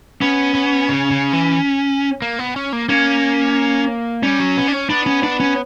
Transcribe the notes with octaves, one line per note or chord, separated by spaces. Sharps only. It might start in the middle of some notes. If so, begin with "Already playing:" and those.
B3 C#4
B3
C#3
C#3
E3
A#3
B3
C#4
A#3
A#3 C#4
G3 C#4
F#3
B3
D4
C#4
B3 D4
C#4
D4
C#4